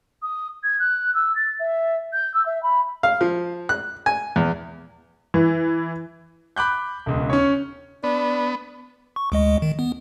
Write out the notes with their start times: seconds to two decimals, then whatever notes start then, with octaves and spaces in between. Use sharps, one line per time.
0.22 D#6
0.63 G#6
0.79 F#6
1.15 E6
1.35 A6
1.59 E5
2.13 G6
2.34 E6
2.46 E5
2.63 B5
3.03 F5
3.21 F3
3.69 F#6
4.06 G#5
4.36 E2
5.34 E3
6.56 B5 D6 F#6 G6
7.06 E1 C#2
7.30 C#4 C#5
8.03 B3 D4
9.16 C#6
9.32 D2 G#3 D#5
9.62 D#3
9.79 B3